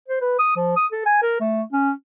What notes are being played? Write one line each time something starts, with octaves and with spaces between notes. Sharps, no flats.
C5
B4
D#6
F3
D#6
A4
G#5
A#4
A3
C#4